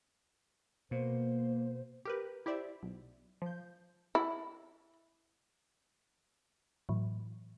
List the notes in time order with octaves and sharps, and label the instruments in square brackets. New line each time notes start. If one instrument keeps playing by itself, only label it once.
[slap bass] B2 [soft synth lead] A#3 [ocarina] C5
[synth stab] G4 A#4 B4
E4 G4 C5 D5 E5
B1
F3 G6
[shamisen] E4
[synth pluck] A2 E3 F#3